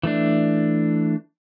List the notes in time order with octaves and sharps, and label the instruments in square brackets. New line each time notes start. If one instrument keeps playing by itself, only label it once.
[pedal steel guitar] E3 A3 D4